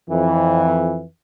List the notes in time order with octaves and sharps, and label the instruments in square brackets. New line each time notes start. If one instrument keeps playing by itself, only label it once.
[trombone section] F2 E3